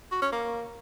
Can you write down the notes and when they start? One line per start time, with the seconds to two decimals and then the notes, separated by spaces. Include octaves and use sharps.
0.12 F#4
0.22 C#4
0.32 A#3